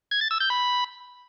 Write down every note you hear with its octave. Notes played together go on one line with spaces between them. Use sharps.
G#6
A6
E6
G6
B5